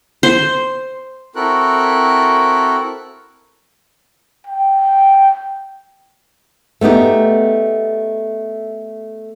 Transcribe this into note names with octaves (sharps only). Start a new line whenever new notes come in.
C5
C4 E4 F#4 A4 A#4 F#6
G5
A3 B3 D#4 G4